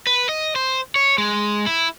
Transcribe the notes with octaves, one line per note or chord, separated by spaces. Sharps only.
B4
D#5
C5
C#5
G#3
E4